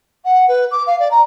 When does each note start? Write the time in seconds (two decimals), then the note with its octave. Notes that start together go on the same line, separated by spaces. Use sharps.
0.24 F#5
0.48 B4
0.71 D6
0.87 F5
0.99 D5
1.11 A#5